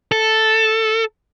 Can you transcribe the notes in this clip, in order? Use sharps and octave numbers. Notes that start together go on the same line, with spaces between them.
A4